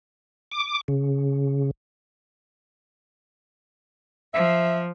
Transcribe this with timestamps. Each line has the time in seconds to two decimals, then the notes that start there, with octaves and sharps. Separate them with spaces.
0.52 D6
0.88 C#3
4.34 F3 E5